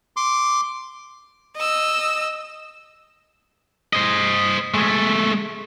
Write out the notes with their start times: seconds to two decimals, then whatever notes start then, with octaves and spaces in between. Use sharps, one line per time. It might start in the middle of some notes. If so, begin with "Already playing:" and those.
0.16 C6 D6
1.56 D#5 E6
3.93 C5 D#5
4.74 G#3 A3